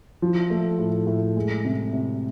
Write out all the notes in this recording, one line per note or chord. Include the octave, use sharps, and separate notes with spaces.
F3
A3
A2
A2
G#3
C3
C3